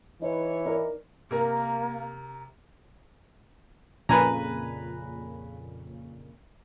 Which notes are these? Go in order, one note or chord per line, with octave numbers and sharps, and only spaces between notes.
E3 D#4 C#5
D#4 A#4 D5
C3 A#3 A#4
F2 A#2 C#3 B4 G#5 A#5